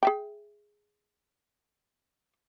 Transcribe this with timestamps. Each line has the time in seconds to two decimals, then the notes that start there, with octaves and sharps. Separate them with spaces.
0.03 G#4 E5 G5